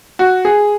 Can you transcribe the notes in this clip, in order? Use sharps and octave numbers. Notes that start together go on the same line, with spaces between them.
F#4
G#4